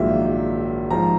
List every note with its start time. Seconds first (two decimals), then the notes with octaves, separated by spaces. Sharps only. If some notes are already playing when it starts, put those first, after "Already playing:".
Already playing: A#1 G#2 D#3 F#3 A#3 E5
0.90 G#2 F3 A#5